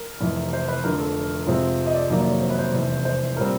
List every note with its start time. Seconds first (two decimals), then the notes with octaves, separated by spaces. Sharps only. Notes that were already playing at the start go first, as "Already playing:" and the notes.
Already playing: A#4
0.21 F1 F2 C3 E3
0.53 C5
0.68 B4
0.84 F1 F2 D3 A#4
0.99 A4
1.47 F2 C3 F3 G#3 C4
1.86 D#5
1.94 D5
2.10 F2 C3 D#3 F#3 A#3 D5
2.21 D5
2.31 C#5
2.41 C5
2.50 B4
2.59 C5
2.73 F1 E2 C3
3.05 C5
3.37 A#2 G3 C4 A#4